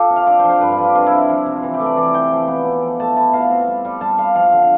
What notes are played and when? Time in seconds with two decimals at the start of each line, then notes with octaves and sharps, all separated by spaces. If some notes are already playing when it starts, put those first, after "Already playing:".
Already playing: F4 G4 A4
0.10 C3
0.16 F5
0.27 D4 D5
0.39 C5
0.44 F3
0.49 C5
0.61 G2 B4
0.72 F4
0.78 D4
0.84 G4
0.95 C3 F4
1.06 E4
1.12 C4
1.18 E4
1.29 F3
1.46 C3
1.63 E3
1.74 G4
1.80 A3
1.86 D5
1.97 E3 D5
2.14 E3 G5
2.31 F3
2.48 B3
2.65 B3
2.82 F3
3.00 A3 A5
3.16 E4 A5
3.33 B2 F5
3.51 C4
3.67 G3
3.85 G3
4.01 G3 A5
4.18 G3 F5
4.35 F3 F5
4.52 D3